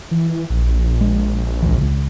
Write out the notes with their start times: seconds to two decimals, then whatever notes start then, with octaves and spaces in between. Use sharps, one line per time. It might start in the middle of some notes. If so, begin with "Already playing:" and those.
0.11 E3
0.50 A#1
1.01 G#3
1.63 C#2 E3
1.78 C#2 C#3